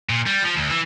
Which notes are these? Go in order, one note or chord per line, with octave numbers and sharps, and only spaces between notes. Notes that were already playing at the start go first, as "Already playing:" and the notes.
A#2
G3
F3
D2
E3